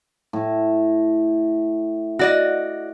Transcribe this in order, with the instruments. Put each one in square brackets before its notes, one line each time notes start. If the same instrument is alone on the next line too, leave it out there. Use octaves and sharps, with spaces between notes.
[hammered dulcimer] A2
[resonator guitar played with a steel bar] F#4 D5 D#5